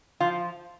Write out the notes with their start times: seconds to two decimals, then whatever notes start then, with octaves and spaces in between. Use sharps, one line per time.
0.20 F3 F4